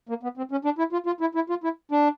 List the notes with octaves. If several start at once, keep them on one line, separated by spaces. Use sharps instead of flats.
A#3
B3
C4
C#4
D4
E4
F4
F4
E4
E4
F4
E4
D4